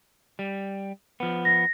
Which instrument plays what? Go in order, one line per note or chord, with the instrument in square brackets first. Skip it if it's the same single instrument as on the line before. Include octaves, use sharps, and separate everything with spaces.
[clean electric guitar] G3
F3 B3
[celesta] A#6